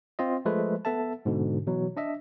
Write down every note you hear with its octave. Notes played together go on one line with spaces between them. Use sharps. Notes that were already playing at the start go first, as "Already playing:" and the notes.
C4 F4 D#5
F3 G#3 A3 B4
B3 A4 E5 A5
G#2 B2 D3
B2 E3 F#3
D4 D#5 E5